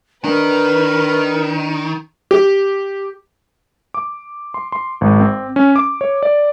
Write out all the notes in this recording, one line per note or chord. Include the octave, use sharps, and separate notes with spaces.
D#3 D4 A#4 B4
G4
D6
C6
C6
G#1
C4
C#4
D6
C#5
D5